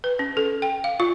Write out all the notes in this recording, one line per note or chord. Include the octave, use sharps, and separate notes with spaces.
B4
C#4
A4
G5
F5
F4